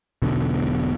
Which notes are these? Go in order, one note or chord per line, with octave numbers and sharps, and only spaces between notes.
E1 B1 B2 D3